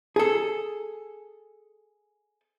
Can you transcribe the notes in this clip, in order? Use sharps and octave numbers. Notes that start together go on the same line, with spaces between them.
G#4 A4